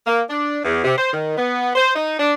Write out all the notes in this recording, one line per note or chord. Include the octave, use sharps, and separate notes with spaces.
A#3
D4
E2
C3
C5
D#3
B3
C5
D#4
D4